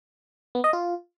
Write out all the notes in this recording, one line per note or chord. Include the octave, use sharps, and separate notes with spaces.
B3
D#5
F4